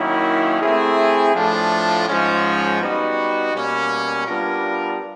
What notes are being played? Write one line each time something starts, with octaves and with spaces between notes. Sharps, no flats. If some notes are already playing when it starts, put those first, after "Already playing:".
Already playing: D#3 F#3 A#3 C#4 E4
A3 C4 E4 G#4
A2 F3 A3 D4 F4
G#2 F3 G#3 C#4
G3 B3 D#4 F#4
B2 G3 A#3 C#4
G3 B3 D4 F4 A#4